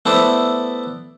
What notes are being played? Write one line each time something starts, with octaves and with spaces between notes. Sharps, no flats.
A3 B3 E4 C5 D5